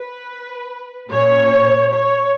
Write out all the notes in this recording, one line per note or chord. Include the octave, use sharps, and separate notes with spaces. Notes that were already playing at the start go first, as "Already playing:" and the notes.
Already playing: B4
A#2 A#3 C#4 C#5
C#5